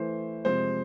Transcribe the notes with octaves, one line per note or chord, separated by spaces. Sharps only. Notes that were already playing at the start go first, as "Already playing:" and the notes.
Already playing: E3 A3 E4 C5
C3 F3 G#3 C5